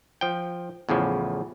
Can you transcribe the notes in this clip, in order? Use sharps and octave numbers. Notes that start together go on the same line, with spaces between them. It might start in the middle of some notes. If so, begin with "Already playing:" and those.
F3 G5
E2 A2 C#3 F3